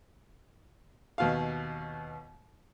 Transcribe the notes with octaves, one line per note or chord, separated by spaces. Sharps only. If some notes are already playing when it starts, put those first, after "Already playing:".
D#2 B2 F5